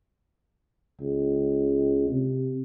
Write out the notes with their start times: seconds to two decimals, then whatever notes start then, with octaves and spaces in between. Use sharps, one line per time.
1.00 C#2
2.10 C3